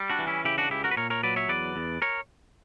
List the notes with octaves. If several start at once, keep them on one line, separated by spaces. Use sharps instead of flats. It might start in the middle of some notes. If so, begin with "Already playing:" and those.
Already playing: G3
D4 F#4
E3
C#4 E4
C#3 E4 G4
D4 F#4
C#2 E4 G4
F#4 A#4
B4
A#2 A#4 C#5
A#4 C#5
F#3 B4 D5
C#5 E5
E2 B4 D5
E2
A#4 C#5